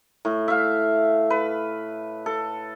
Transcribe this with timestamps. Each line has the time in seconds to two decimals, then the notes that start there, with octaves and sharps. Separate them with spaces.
0.25 A2
0.48 E5 F5
1.30 B4
2.26 A4